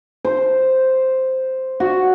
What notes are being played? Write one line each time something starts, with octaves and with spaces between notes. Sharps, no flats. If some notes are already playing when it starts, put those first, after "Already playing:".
C5
F#4